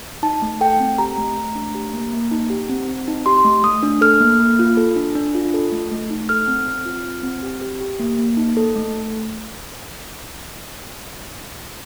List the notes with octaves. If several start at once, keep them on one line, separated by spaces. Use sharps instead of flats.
D#4 A5
A3
A4 G5
C4
G4 A#5
A3
A3
D4
G4
A#3
A#3
D#4
G4
C4
C4
D#4
G4 C6
A3
A3 D#6
D4
A4 F6
A#3
A#3
F4
A4
D4
D4
F4
A4
A3
A3
D#4
A4 F6
C4
C4
F4
C4
C4
G4
G4
G4
A#3
A#3
D#4
A4
A3